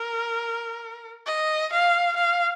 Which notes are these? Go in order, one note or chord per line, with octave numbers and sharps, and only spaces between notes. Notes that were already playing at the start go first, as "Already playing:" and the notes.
Already playing: A#4
D#5
F5
F5